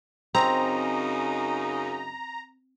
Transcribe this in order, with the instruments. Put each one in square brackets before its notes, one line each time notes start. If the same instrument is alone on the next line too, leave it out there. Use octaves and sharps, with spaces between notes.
[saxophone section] F#2 C#3 D#4 [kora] C4 [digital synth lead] A#5